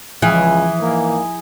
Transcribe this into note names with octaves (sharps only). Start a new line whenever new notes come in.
C#2 E3 F3 G#4 F6
G#2 A#3